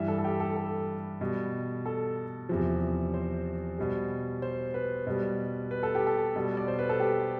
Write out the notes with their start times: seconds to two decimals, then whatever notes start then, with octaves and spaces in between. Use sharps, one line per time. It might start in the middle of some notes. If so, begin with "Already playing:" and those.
Already playing: G2 E3 G3 E5
0.08 A4
0.18 A4
0.24 G4
0.40 A4
0.56 A4
1.21 B2 G3
1.86 A4
2.49 E2 C3 F3
3.14 C5
3.79 B2 G3
4.42 C5
4.74 B4
5.07 B2 G3
5.71 B4
5.83 A4
5.95 G4
6.07 A4
6.36 B2 G3
6.57 D5
6.68 C5
6.79 B4
6.89 A4
7.00 G4